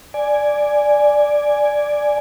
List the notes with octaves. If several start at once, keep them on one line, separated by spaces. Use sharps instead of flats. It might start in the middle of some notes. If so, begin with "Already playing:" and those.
D5 G#5